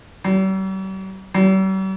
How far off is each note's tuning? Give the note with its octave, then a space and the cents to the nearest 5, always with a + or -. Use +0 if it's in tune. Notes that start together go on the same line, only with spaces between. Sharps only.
G3 -45
G3 -45